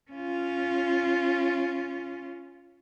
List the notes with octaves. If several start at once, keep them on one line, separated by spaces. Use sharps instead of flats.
C#4 F4